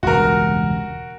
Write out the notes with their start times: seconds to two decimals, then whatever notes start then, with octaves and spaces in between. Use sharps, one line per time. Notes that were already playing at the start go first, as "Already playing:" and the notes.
0.03 E1 C#2 G2 F#4 A#4